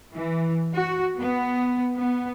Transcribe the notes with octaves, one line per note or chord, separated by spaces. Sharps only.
E3
F#4
B3
B3